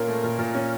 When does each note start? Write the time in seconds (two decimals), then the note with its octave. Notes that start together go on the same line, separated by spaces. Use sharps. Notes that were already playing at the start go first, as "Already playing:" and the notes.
Already playing: A#2 A#3 C#4 A#4
0.08 A3
0.24 A#2
0.39 A#2
0.55 C#4